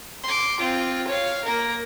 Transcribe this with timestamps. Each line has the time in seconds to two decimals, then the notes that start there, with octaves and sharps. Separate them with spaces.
0.24 C6 D6
0.60 C4 F4
1.07 C#5 F5
1.44 A#3 A#4